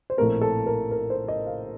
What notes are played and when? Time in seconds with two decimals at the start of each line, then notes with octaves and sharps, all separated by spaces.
0.10 C5
0.17 A#1 A2 A3 C4 A#4
0.41 A4
0.66 A#4
0.91 A#4
1.10 C5
1.28 D#5
1.46 F5